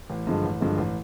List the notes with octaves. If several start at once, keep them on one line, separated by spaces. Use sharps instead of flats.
A1
G2 D3 F3 G#3
A1
G2 D3 F3 G#3
A1